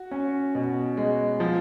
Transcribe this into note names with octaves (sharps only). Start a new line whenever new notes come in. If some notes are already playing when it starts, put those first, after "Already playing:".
Already playing: F#4
C#4
B2
G#3
F3